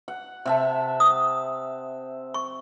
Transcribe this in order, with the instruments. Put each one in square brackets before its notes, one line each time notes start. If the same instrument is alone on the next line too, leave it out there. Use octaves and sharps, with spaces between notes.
[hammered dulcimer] F#5
C3 E5 A5
[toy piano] D#6
C#6